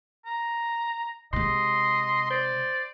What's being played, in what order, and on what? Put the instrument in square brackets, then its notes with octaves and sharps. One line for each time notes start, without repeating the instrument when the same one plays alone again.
[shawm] A#5
[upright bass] C3 G#3 [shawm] D#5 [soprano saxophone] C6
[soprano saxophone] C5 [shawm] D5